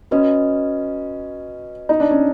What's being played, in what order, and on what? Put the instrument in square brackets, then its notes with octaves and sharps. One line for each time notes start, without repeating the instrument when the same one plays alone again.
[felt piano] C#4 [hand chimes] F#4 B4 D#5
[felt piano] D#4
D4
C#4